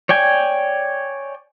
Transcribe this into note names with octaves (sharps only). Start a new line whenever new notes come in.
C#5 D5 G5 G#5